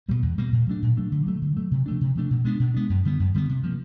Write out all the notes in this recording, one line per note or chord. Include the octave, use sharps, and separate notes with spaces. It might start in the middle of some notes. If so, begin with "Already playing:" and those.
B2 G3 A#3
E2
B2 G3 A#3
A#2
F#3 A3 D4
A#2
F#3 A3 D4
D3
F#3 A3
D3
F#3 A3
C3
F3 A3 D4
C3
F3 A3 D4
B2
G#3 B3 D4
B2
G#3 B3 D4
F#2
D3 G3 B3
F#2
D3 G3 B3
C3
F3 A#3